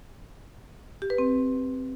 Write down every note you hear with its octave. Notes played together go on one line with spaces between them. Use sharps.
G4
B4
C4